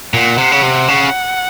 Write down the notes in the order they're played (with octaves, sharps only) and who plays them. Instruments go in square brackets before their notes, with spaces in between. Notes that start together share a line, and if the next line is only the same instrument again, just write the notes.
[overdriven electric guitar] A#2 [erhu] F#5
[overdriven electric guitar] C3
C#3
C3
C#3